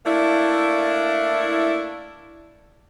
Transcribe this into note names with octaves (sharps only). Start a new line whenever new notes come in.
A3 A#3 D4 E4